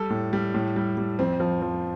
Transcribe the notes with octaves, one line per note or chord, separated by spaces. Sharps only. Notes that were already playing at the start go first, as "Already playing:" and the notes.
Already playing: G3 A4
A2
G3
A2
G3
G3
F2 C4
F3
F3